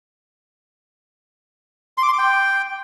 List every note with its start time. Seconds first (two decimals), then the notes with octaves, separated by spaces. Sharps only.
1.98 C6
2.03 D6
2.08 C6
2.13 D6
2.18 G5